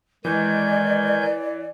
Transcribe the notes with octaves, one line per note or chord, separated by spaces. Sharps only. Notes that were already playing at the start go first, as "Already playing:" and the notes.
D#3 E3 G#3 D5 G#5 G6